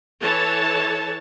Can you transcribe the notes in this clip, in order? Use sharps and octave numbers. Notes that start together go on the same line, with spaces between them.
E3 A4 C#5 A5